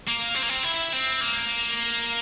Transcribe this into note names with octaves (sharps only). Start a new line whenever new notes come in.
A#3
C4
A#3
C4
E4
C4
A#3